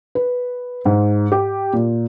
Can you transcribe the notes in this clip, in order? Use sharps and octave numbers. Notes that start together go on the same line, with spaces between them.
B4
G#2
G4
A#2